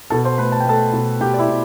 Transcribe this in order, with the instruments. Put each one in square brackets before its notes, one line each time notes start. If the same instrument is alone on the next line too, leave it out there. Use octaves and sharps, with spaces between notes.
[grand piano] B2 A4 A5
C5 C6
A3 B4 B5
A5
G5
A3 A4 A5
B2
B2 G4 G5
D5
E4 E5
B2